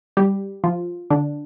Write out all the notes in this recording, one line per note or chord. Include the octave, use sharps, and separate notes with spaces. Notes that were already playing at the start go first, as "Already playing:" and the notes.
G3 G4
F3 F4
D3 D4